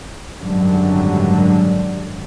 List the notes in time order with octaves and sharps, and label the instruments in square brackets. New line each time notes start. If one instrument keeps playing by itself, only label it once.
[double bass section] G#1 F#2 D3 F#3 G3